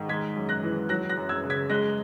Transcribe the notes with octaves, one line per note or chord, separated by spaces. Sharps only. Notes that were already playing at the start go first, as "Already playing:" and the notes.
Already playing: G#2 D#3
G#3 G#6 B6
F#2
F#6 A#6
E3
F#3 F#6 A#6
F#6 A#6
F#2
E6 G#6
C#3
G#6 B6
G#3 F#6 A#6